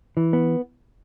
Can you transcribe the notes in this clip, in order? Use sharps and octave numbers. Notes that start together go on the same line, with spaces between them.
E3
B3